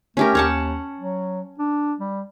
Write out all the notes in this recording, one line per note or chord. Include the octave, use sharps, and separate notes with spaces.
A3 C#4 G4 A#4
D#2 C#5 F#5 A5
F#3
D4
G3